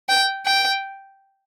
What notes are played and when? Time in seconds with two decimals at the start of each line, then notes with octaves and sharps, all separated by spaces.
0.09 G5
0.46 G5